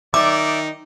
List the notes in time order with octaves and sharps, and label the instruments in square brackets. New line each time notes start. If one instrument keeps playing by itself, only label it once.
[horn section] D#3 D#4 [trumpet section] D5 [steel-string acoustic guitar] E5 [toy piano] D6